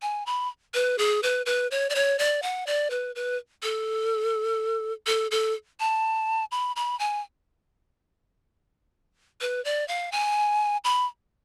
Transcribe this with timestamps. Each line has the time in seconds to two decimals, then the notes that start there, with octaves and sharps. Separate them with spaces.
0.02 G#5
0.26 B5
0.74 B4
0.98 G#4
1.23 B4
1.46 B4
1.71 C#5
1.90 D5
1.95 C#5
2.19 D5
2.42 F#5
2.67 D5
2.90 B4
3.15 B4
3.63 A4
5.07 A4
5.31 A4
5.80 A5
6.51 B5
6.76 B5
6.99 G#5
9.41 B4
9.65 D5
9.88 F5
10.12 G#5
10.84 B5